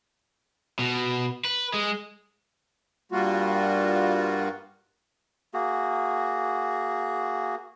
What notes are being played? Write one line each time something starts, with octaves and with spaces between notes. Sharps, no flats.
B2
B4
G#3
G2 G3 A#3 F4 F#4
A#3 F#4 G#4